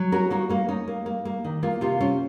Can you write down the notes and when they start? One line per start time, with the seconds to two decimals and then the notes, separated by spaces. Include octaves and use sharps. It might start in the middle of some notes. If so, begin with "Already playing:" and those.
Already playing: F#3
0.12 C#4 F#4 A#4
0.30 A#3 D#4 F#4
0.49 A#3 D#4
0.69 C#4 D#4
0.88 A#3
1.06 A#3
1.25 A#3
1.45 D#3
1.63 A#3 F4
1.81 C3 F4
2.00 C#4 F4